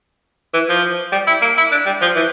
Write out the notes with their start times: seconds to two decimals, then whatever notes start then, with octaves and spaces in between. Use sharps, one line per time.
0.54 E3
0.69 F3
1.12 G3
1.27 E4
1.42 A#3
1.58 E4
1.72 D4
1.86 G3
2.02 F3
2.16 E3